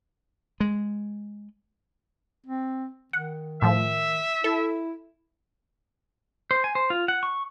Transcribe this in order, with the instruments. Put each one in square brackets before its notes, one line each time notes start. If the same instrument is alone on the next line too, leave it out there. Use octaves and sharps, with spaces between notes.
[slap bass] G#3
[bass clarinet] C4
[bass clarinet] D#3 [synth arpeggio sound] F#5
[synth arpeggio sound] A2 F3 [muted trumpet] E5
[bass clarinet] E4 [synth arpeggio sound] A4
[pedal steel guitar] C5
G#5
C5
F4
F#5
C#6